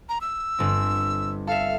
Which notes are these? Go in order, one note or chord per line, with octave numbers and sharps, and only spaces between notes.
A#5
E6
G1 C4
A4 E5 F5